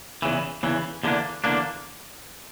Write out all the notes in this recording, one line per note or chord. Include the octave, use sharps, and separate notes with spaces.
E2 C#3 E3
E2 C#3 E3
E2 D3 A#3 D4
E2 D3 A#3 D4